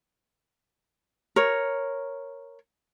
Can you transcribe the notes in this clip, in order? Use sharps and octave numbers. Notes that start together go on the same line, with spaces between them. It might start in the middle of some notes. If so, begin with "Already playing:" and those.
A#4 C#5